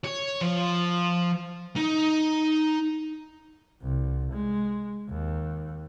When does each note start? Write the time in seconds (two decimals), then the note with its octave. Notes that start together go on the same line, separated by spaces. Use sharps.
0.04 C#5
0.41 F3
1.76 D#4
3.82 C2
4.32 G#3
5.09 D#2